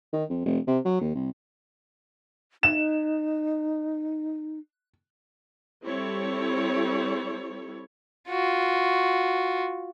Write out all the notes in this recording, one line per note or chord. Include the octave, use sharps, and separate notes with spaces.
D#3
F2
F1
C3
F#3
D#2
C2
D#4 E7
G3 C4 E4 A4 C#5
F4 F#4